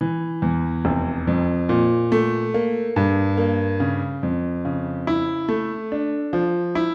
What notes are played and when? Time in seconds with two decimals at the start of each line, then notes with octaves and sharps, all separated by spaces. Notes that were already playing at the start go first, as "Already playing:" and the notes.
0.01 E3
0.42 E2
0.85 F1
1.27 F2
1.69 A#2
2.12 A3
2.54 A#3
2.96 G2
3.37 A#3
3.80 C#3
4.23 F2
4.65 C#3
5.07 E4
5.49 A3
5.92 D4
6.33 F3
6.75 E4